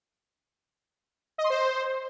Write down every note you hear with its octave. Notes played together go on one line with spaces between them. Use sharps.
D#5
C6
C5